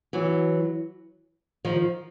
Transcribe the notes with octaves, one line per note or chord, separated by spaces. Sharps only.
E3 F#3
D#3 F3